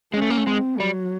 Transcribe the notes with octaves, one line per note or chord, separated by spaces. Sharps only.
G#3 C#4
A3
A#3
A3
G#3 C4
F#3 G3